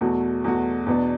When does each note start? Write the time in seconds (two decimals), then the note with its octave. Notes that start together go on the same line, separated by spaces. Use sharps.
0.01 E2 B2 A3 F#4
0.44 E2 B2 A3 F#4
0.86 E2 B2 B3 D4